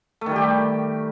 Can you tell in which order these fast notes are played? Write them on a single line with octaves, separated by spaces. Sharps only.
A3 D#3 G3 G4